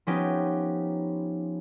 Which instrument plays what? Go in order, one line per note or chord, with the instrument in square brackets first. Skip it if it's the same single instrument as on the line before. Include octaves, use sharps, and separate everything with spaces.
[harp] F3 B3 C#4 D#4 G4